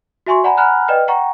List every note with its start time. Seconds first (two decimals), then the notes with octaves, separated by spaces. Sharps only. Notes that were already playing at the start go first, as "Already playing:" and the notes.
0.27 F#4 E5 G#5 C6 C#6
0.44 D5 F#5 G#5 A#5 B5
0.57 F#5 G#5 A#5 B5 F6 F#6
0.88 B4 D5 D#5 G5 F6
1.08 F#5 G5 A#5 C#6